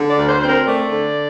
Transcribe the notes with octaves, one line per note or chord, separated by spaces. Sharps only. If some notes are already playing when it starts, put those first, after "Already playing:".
Already playing: D3
D5
D2
C5
C4 C5
A#4
A3 D5
D3